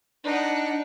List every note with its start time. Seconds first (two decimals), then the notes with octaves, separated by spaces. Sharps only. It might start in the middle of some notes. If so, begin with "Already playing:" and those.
0.24 D4 D#4 F#5